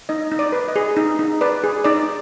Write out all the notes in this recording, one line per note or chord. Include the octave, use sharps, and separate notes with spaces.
D#4 D#5
D#4
D5
B4
D#5
G#4
D#4
D#4
B4 D5
G#4
D#4 D5